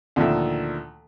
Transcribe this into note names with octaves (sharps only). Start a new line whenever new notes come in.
D2 A#2 D#3 F3 A4 E5